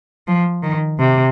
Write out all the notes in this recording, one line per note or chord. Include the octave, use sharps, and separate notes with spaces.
F3
D#3
C3